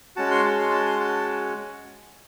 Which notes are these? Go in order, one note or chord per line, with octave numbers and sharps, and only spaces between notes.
G#3 C#4 F#4 A5
C6
A5
C6
A5
C6
A5